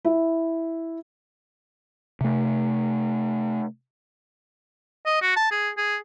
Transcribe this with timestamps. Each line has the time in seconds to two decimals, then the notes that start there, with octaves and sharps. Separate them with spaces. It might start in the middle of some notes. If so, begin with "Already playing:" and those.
0.05 E4
2.21 C3 A3
5.06 D#5
5.22 F#4
5.36 A5
5.51 G#4
5.77 G#4